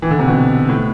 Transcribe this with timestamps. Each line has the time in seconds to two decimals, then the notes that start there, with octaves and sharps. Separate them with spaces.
0.02 E3
0.11 D3
0.19 C3
0.27 B2
0.69 A2